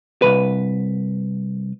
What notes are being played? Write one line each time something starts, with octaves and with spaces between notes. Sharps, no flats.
C2 B2 B4